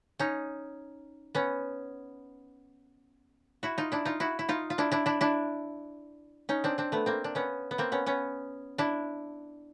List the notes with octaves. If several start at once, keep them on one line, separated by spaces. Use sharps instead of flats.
C#4 D#4
B3 C#4
E4 F#4
D#4 F4
D4 E4
D#4 F4
E4 F#4
E4
D#4 F4
F4
D4 E4
D4 E4
D4 E4
D4 E4
C#4 D#4
C4 D4
C4 D4
A3 B3
A#3 C4
D4
B3 C#4
B3
A#3 C4
B3 C#4
B3 C#4
D4 E4